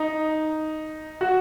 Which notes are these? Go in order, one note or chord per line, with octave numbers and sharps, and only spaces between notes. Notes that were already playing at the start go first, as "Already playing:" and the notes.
Already playing: D#4
F#4